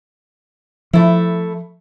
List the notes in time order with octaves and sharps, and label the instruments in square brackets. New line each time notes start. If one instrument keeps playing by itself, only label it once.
[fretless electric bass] F3 [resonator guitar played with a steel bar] A3 E4